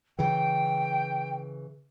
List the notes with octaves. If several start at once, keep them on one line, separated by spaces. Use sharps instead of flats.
C#3 E3 G5